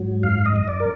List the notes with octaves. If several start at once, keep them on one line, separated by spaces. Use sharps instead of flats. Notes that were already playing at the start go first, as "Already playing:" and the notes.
Already playing: G#2 F#3
F#2 F5
D#5
F#2
D5
A#4